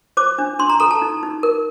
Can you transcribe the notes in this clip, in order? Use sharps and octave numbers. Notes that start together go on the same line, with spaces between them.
C5 D6
D4
D4 C6
A#5
A4 A#5
A5
D#4
D#4
A#4